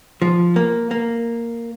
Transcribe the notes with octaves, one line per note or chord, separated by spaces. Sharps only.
F3
A#3
A#3